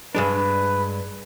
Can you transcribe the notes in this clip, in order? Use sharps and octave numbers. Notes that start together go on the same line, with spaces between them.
G2 G#3 D4 B4